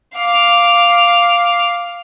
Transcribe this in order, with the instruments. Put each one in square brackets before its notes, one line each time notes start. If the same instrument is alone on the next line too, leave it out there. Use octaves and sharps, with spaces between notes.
[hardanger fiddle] F5 D6